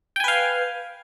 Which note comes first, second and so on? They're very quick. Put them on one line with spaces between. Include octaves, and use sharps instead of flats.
G5 G#5 B4 F5